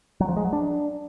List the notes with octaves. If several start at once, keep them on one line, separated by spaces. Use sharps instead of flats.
F#3
F3
G#3
F#3
D4